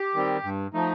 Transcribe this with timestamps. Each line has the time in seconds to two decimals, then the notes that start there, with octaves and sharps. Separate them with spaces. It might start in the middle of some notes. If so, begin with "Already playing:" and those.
Already playing: G4
0.14 D#3 G3 C4
0.43 G2
0.74 F3 A3 D#4